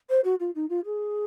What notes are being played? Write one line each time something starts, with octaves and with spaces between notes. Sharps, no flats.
C5
F#4
F4
D#4
F4
G#4